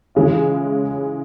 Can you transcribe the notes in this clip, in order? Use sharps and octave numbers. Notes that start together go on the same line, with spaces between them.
C#3 E3 G#3 C#4 F4